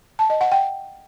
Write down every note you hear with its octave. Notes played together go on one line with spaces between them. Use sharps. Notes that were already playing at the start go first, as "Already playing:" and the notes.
A5
D#5
F#5
G5